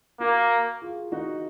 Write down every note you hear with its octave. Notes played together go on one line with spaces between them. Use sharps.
A#3 F#4 A#4
F4 G#4
D#4 F#4